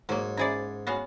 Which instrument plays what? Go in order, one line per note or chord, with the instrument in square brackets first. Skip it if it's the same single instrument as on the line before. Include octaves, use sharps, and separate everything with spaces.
[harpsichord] G#2 [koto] F#3 A#3 [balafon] C#5
[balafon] C#4 C5 E5 [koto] E4 G#4 D5
[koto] B3 F#4 F5 [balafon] C#5 G#5